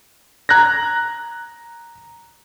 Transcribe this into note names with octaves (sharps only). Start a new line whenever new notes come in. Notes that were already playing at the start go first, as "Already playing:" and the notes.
A#5 F#6 G#6 A#6